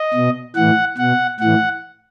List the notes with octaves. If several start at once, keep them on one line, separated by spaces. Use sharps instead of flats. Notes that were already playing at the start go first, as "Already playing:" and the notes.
Already playing: D#5
B2
A2 E3 F#5
B2 F#5
A2 E3 F#5